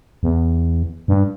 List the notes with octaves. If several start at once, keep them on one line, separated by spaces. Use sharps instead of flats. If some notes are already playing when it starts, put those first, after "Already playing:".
E2
G2